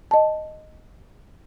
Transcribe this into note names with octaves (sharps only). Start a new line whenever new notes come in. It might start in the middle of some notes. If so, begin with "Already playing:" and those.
D#5 A5